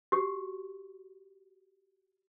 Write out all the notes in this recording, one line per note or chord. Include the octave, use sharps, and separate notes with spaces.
F#4 G4